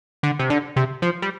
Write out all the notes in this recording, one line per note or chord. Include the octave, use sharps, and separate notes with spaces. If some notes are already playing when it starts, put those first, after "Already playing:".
D3
C3
D3
C3
F3
G3